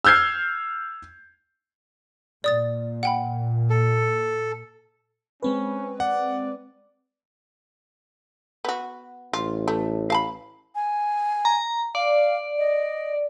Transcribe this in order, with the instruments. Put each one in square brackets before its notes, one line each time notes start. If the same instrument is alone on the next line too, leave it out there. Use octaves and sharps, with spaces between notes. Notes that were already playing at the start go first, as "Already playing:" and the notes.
[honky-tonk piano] E6 F6 G6 G#6 C7
[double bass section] A#2 [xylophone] D5 D#6 A6
[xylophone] F#5 G5 B5
[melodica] A4
[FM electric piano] G#3 C4 B4 [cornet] C#4
[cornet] D5 [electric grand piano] F#5
[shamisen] B3 F#4
[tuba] A1 [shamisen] F4
[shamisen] A3
F5 A5 B5
[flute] G#5
[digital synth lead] A#5
[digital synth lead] D5 [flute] F5
[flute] D#5